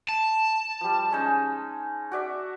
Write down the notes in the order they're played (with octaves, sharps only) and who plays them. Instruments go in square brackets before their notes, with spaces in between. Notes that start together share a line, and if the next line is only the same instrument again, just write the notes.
[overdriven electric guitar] A5
[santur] F3 G3
G#3 C#4 D#4
F#4 D5 E5